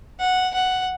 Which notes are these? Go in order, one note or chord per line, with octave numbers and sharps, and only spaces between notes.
F#5
F#5